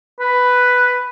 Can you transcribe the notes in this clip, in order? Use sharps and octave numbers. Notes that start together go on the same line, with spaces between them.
B4